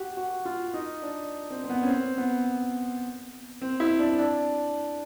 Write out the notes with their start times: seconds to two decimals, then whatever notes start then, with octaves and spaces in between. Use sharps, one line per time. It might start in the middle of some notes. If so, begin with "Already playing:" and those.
Already playing: F#4 G4
0.17 F#4
0.45 F4
0.74 D#4
1.02 D4
1.50 C4
1.64 C4
1.70 B3
1.83 C#4
1.89 C4
2.18 B3
3.62 C4
3.80 E4
3.99 D4
4.19 D4